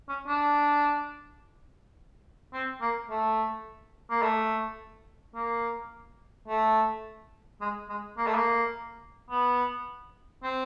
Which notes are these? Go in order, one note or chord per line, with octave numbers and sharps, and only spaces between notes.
C#4
D4
C4
A#3
A3
A#3
A3
A#3
A3
G#3
G#3
A#3
A3
A#3
B3
C4